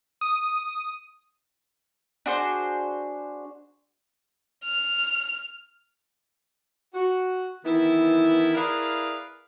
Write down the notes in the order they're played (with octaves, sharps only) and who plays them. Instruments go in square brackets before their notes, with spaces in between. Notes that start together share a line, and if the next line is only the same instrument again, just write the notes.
[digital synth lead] D#6
[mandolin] D4 F#4 G#4 C5
[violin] F6
[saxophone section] F#4
D#3 E3 B3 E4
E4 G#4 A#4 B4 D5 F5